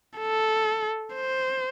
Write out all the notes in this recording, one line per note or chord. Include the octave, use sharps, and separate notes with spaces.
A4
C5